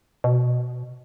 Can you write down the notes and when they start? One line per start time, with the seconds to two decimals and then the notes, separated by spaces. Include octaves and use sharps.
0.24 B2